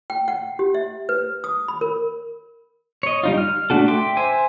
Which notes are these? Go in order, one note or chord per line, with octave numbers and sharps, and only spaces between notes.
G5
F#5
G4
E5
B4
D#6
B5
A#4
C#5 D#5
G3 D#4 F4
F6
A3 A#3 D4 F#4 A4
E5 G5 C6 D6
C5 E5 G#5